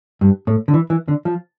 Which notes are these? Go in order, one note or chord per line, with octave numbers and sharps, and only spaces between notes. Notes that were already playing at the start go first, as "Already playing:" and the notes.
G2
A2
D3
E3
E3
D3
F3